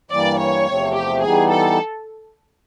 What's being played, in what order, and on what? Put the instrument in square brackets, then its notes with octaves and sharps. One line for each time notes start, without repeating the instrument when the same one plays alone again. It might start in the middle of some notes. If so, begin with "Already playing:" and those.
[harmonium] G2 E3 G3 A#3 [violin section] D5
[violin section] C#5
[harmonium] E2 C3 F3 A3 C4
[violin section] G4
[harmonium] E3 G3 B3 D#4 G4 [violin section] G#4
[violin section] A4